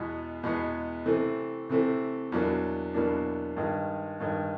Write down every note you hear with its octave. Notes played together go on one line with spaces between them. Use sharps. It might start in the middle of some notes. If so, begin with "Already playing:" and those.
Already playing: E2 B2 G#3 B3
E2 B2 G#3 B3
C3 E3 A3 C4
C3 E3 A3 C4
E2 B2 F#3 A#3 D4
E2 B2 F#3 A#3 D4
G2 D#3 G#3
G2 D#3 G#3